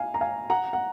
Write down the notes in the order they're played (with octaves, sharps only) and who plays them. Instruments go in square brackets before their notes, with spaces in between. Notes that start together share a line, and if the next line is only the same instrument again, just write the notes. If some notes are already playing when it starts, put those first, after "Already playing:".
Already playing: [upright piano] F5 G#5
A#5
F5 G#5
F#5 A#5
F#5